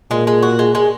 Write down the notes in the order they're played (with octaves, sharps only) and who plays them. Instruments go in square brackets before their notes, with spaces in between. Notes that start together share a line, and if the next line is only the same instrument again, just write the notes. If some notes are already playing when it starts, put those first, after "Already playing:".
[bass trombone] A#2 [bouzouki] G#3
[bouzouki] G#3
F#4
G#3
G#3